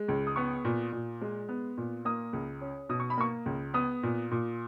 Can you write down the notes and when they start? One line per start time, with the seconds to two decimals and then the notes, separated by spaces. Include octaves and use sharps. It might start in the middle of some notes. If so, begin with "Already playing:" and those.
Already playing: G#3
0.08 C#2
0.27 D#6
0.36 B3 C#6
0.65 A#2
0.92 A#2
1.21 G#3
1.49 B3
1.77 A#2
2.05 A#3 D#6
2.33 C#2
2.61 C#4
2.89 B2 D#6
3.00 C#6
3.10 B5
3.18 A#3 C#6
3.46 C#2
3.74 B3 D#6
4.03 A#2
4.31 A#2